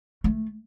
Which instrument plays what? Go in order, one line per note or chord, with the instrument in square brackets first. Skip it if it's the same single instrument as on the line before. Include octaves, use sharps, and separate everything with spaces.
[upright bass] A3